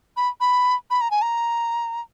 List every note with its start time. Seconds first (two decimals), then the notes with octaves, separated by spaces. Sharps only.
0.17 B5
0.40 B5
0.90 B5
1.01 A#5
1.11 G#5
1.22 A#5